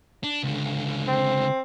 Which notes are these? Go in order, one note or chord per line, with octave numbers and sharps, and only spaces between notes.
D4
C#2 D3
C4